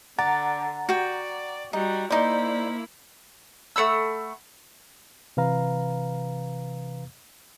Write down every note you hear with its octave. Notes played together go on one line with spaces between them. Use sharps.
D3 D5 F#5 A#5 A6
F#4 D5 G5
G3 D#4 F#4
A#3 D#4 E4 C5 D5
A3 F#5 B5 E6
C3 E3 B4 F5 A#5